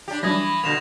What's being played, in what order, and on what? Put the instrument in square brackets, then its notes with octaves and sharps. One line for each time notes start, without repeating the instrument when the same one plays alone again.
[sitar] D4 G4
[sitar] E3 [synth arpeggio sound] F#3 G3 D4 [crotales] D#6 G#6 A#6
[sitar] B2 D3 A#3 [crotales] A#6 E7 F7